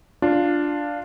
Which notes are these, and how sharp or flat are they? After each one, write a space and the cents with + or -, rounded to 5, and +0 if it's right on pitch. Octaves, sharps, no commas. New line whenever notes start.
D4 +0 F4 +0